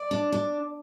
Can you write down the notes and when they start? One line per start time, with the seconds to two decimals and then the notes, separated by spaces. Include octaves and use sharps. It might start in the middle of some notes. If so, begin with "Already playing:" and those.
Already playing: D5
0.11 D4
0.32 D4